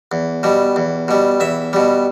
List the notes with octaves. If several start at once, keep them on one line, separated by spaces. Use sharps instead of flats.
E2
B2 G3
E2
B2 G3
E2 E5
B2 G3